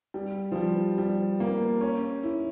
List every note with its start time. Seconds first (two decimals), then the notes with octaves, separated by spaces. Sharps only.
0.14 G3
0.52 F3
0.56 G3
0.98 G3
1.40 A#3
1.81 C#4
2.23 E4